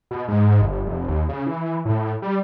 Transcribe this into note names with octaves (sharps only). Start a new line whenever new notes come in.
B2
G#2
G1
F1
D#2
C#3
E3
A2
G3